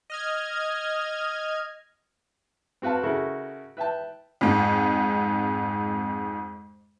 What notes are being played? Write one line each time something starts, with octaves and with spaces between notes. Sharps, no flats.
D#5 F6 G#6
C4 F#4 B4 F5 A5
C#3 E4 F#4 A4 A#4
B4 E5 G5 A5
F2 G#2